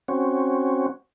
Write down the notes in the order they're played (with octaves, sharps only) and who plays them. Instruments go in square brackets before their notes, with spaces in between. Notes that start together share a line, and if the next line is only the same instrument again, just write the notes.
[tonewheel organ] C4 C#4 F#4